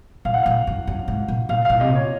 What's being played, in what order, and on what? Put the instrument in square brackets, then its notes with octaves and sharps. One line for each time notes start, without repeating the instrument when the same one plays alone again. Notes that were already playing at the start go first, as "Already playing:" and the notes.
[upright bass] A#2 [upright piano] F5
[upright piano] F#5
[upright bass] A#2 [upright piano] F5
[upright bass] F#2
F#2
G#2
A#2
[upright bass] A#2 [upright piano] F5
[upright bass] A#2 [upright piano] F5
[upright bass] C3 [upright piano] D#5
[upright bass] A#2
[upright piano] C#5